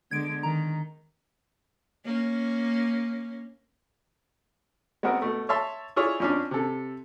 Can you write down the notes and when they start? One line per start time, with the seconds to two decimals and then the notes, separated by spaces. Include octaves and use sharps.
0.11 D3 G#3 B3 G#6 D7
0.43 D#3 A#5
2.05 A#3 C#4
5.03 G#3 B3 C4 F#4 A#4
5.22 B2 A3
5.49 C#5 E5 A5 C6
5.96 E4 F4 G#4 C#5 D5
6.20 F2 C#4 D4
6.51 C3 A4